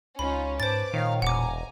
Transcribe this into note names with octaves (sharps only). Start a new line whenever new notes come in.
C#2 C#4 D#4 F4 B5
G#2 B4 C5 A5 D6 A6
A#2 D#3 C#5 F5
E1 F#5 G#5 A#5 D6